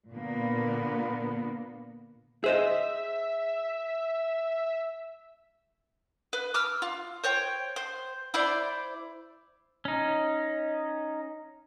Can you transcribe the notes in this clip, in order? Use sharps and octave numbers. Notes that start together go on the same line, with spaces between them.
A#2 D3 A#3 B3
G#4 C5 D#5 E5
B4
D6 E6 F6
F4
C5 C#5 G5
C5
E4 C5 D5
C#4 D#4